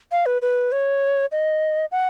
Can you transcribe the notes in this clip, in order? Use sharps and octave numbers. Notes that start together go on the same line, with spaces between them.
F5
B4
B4
C#5
D#5
F#5